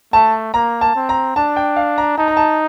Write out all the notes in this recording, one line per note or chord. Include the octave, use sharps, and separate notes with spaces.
A3 A5
A#3 A#5
A5
C4
A#5
D4 A5
G5
F5
A#5
D#4 A5
A#5
A5